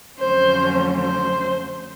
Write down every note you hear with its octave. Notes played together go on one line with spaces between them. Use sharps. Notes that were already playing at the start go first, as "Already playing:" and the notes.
F2 D3 F#3 A3 C#4 C5
C5